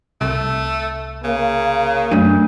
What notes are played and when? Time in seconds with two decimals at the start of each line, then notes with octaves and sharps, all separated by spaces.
0.21 C2 A3
1.24 C#3 A#3
2.12 F#2 A3 D4